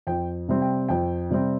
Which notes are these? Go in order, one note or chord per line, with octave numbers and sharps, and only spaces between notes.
F2 G5
C3 G3 C4
G5
F2 G5
C3 G3 C4